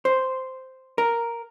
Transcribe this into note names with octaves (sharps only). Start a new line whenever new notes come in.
C5
A#4